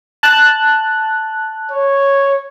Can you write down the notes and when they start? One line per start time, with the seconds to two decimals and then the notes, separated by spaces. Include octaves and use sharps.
0.23 A5 F#6
1.72 C#5